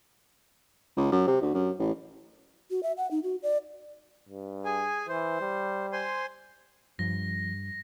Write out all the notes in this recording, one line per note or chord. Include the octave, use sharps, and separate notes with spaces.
C#2
F#2
C3
D2
F#2
A1
F#4
E5
F#5
D#4
F#4
D5
G2
G#4 G#5
E3 C5
G3
C5 G#5 C6
G2 F3 A#6